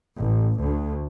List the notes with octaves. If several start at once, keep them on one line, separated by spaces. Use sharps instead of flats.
A1
D2